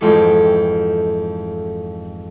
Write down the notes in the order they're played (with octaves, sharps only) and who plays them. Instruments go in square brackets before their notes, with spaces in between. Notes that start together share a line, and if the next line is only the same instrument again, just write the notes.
[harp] F2 G#2 E3 [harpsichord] A3 G5